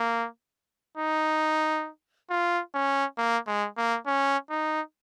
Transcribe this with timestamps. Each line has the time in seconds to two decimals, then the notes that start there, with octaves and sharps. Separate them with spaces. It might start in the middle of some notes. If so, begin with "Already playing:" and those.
Already playing: A#3
0.97 D#4
2.30 F4
2.74 C#4
3.17 A#3
3.47 G#3
3.77 A#3
4.06 C#4
4.50 D#4